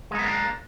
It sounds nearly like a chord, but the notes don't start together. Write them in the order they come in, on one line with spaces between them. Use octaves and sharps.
G#3 D#4 B3 A#3 D4